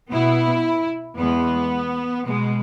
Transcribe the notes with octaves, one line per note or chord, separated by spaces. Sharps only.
B2 B3 E4
E2 E3 G#3 B3
B2 G#3 B3